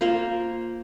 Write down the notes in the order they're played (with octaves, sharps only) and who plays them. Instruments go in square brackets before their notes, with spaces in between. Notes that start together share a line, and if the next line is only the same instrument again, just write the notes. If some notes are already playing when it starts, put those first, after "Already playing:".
[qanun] A#3 F4 C5